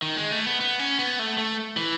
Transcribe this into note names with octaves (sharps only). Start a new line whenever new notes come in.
D#3
G#3
A3
B3
B3
C#4
B3
A3
A3
E3